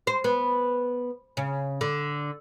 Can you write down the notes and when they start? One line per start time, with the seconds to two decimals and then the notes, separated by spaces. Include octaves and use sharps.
0.07 C5
0.24 B3
1.37 C#3
1.81 D3